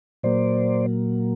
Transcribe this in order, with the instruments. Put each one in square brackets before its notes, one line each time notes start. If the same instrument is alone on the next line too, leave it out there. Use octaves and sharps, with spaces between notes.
[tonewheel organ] A#2 F#3 A#3 C5 D5